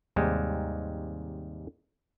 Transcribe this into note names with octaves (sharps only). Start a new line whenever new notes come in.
D#2 G#2 C3 G3 G#3